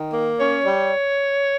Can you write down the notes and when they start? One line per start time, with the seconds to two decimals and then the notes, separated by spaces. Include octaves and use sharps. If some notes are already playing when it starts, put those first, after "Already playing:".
Already playing: D#3
0.13 A#3
0.39 C#4 C#5
0.64 G3